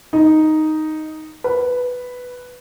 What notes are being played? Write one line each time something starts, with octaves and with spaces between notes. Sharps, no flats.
D#4
B4